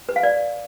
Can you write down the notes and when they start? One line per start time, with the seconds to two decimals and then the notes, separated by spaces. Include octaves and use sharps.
0.09 B4
0.16 F5
0.23 D5